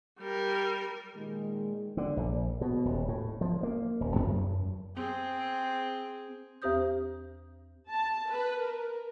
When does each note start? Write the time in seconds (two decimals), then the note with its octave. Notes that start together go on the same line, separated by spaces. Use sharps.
0.20 G3 A#4
1.15 A#2 D#3 G#3
1.97 D3
2.17 A#1
2.61 B2
2.85 D#1
3.08 A2
3.41 F3
3.63 A#3
4.01 D#1
4.16 F#2
4.96 C4 G#4
6.62 E2 C4 G4 C5 D#6 G6
7.90 A5
8.31 B4
8.63 A#4